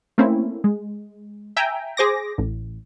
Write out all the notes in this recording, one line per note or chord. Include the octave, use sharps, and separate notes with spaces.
A3 A#3 C4 C#4 E4
G#3
E5 G5 G#5 A#5
G#4 C5 D6 A#6
A1 A2